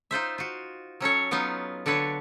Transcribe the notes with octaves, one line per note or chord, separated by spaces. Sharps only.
D#4 F4 C5 E5
F4 F#4
F#3 C#4 A4 C#5
F#3 B3 C#4 D#4 F4
D3 D4 A4 B4 C#5